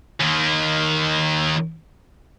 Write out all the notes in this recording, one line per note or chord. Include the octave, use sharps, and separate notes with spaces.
D#2 D#3